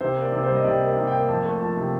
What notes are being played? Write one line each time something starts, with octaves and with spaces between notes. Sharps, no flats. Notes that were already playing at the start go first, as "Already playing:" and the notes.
C3 C5
A#3
D5
C3
C5
G3
D#5
C3 D5
A#3 D#5
C3
G5
A#3
F2 A5
A3
F3 A5
C3